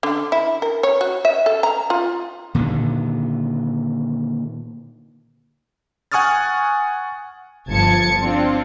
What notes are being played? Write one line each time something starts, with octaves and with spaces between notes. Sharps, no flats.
D3
E4
A#4
C#5
F#4
E5
A4
A#5
F4
A#2 D3 D#3
F#5 G#5 C#6 D#6 F6 A6
G1 F3 A5 G#6 C#7
C4 D4 F4